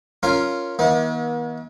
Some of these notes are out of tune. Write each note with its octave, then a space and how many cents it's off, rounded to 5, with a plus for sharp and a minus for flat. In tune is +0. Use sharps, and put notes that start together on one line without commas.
C#4 +0 F4 +0 A#4 +0
D#3 +45 B3 -45